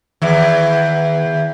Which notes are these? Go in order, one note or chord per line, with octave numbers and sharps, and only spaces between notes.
E2 D#3 E3